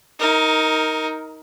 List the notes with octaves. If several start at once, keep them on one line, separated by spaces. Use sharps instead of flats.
D#4 A#4